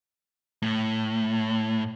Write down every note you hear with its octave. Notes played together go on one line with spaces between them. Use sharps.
A2